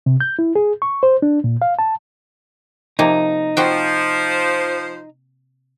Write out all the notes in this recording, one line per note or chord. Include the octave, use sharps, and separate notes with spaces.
C3
G6
E4
G#4
C#6
C5
D4
A#2
F5
A5
C3 F3 A#3 D#4
F3 C4 F#4 C5 G5